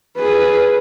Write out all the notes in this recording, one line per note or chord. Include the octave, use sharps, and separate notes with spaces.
G#4 B4